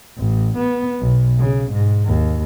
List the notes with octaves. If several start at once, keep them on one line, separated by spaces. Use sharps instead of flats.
A1
B3
B1
C#3
G#2
D#2